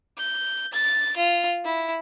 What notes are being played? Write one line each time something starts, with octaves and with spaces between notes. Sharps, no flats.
G6
A6
F4
E4